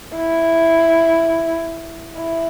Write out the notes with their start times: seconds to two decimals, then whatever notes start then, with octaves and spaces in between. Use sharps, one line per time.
0.16 E4
2.18 E4